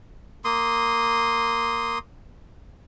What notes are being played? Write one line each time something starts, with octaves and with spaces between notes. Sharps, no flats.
A#3 C6 D#6